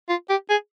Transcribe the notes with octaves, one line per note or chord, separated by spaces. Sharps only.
F4
G4
G#4